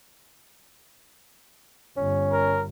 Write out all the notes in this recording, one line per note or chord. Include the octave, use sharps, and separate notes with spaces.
G1 C#4
A#4